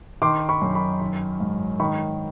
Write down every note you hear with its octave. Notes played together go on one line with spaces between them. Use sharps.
D#3 C6 D6
B5 C#6
F#2
B5 C#6
D#3
G#2
D#3 B5 C#6